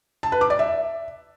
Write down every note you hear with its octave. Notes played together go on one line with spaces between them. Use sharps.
A5
B4
D6
D5
E5